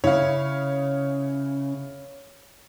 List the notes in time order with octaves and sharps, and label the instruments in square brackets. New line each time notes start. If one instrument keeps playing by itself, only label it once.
[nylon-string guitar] C#3 [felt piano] E4 [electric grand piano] C#5 F5